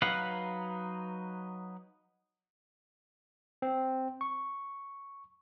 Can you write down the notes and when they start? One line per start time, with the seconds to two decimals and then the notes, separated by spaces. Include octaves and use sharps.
0.02 F#3 D#4 B4 F5 F#5
3.62 C4
4.21 C#6